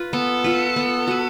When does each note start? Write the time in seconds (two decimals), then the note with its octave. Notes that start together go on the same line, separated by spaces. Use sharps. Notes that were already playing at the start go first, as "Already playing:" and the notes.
Already playing: F4 B4
0.13 B3 A4
0.44 F4 B4
0.76 B3
1.07 F#4 B4